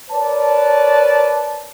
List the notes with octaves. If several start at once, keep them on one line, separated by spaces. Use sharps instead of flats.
A#4 B4 C#5 D5 A5